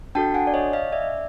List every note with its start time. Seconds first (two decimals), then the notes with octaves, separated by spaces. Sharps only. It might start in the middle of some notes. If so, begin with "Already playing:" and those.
0.15 D4 F#4 A4 G5 A5
0.34 F#5 G#5
0.47 D5
0.54 C#5 D#5
0.73 D#5 F5
0.92 D5 E5